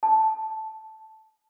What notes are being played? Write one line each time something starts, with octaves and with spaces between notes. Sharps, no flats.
A5